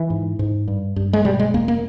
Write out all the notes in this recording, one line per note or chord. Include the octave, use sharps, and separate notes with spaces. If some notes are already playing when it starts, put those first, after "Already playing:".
Already playing: E3
G#2
G#2
G2
G2
G#3
B2 G3
G#3
E2 A#3
A#3